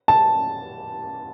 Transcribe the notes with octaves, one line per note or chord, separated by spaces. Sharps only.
A5